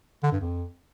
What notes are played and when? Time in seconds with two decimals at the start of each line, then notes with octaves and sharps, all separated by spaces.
0.23 D3
0.32 G2
0.41 F2